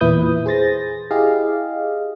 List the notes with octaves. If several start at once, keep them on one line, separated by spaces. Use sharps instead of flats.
E2 A#2 E4 B4 D#6 G6
G#4 C5 A6 A#6
E4 G4 G#4 D#5 F5